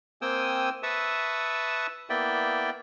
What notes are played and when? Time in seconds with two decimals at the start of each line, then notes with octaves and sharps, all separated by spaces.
0.22 A#3 C4 G5 G#5 D#6 E6
0.83 B4 E5 A5 C#6 D#6 E6
2.10 A#3 B3 E4 D5 E5 G5